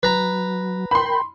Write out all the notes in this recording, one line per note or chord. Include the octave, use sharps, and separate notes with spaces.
F#3 B4 A#5
A#4 G5 B5 C6